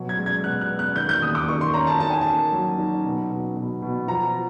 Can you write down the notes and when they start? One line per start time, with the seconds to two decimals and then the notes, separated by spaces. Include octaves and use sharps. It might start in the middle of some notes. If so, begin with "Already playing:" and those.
Already playing: B2 F#3
0.09 G#6
0.18 G#3
0.26 G#6
0.44 B2 F#6
0.61 F#6
0.70 B3
0.79 F#6
0.96 D#3 G6
1.09 G6
1.22 D#2 D#6
1.35 D6
1.48 D#3 C#6
1.61 C6
1.74 C#4 A#5
1.87 A5
2.00 D#4 A5
2.10 G#5
2.21 A#3 A5
2.52 F#3
2.78 D#4
3.05 B2
3.30 B2
3.56 B2
3.82 B2
4.08 F3 A#5
4.34 F3